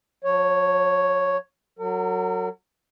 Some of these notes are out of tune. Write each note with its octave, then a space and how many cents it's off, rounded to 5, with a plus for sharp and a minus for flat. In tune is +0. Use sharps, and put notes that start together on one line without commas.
F3 +40 C#5 +0
F#3 +0 A#4 -45